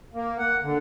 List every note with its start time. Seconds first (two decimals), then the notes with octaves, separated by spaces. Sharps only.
0.14 A#3
0.39 F#5
0.62 D3